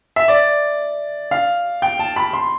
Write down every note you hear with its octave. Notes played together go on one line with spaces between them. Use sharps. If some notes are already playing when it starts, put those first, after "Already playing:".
E5
D5
F5
G5
A5
B5
C6